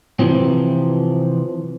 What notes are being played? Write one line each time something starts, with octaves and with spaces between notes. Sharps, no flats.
C3 E3 F3 C4